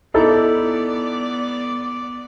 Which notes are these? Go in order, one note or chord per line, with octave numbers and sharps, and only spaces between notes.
B3 D#4 E4 A4 D5